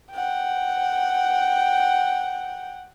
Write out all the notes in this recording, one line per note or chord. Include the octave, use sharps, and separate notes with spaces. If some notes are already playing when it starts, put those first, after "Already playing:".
F#5 G5